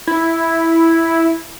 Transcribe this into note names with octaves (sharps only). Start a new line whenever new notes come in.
E4